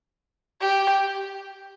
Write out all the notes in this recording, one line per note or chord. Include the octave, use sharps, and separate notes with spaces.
G4